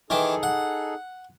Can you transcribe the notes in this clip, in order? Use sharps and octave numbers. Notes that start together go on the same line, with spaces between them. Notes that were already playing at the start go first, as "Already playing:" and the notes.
D#3 E3 D#4 G#4 A4 D6
F#5